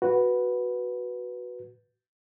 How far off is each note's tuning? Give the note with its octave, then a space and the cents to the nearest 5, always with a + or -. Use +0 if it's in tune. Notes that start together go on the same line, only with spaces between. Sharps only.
F#4 +0 B4 -5